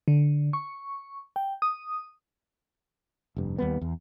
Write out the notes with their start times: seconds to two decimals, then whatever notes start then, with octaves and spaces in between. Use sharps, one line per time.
0.08 D3
0.53 C#6
1.36 G5
1.62 D#6
3.36 F1 G2
3.58 D#2 G3 B3
3.81 E2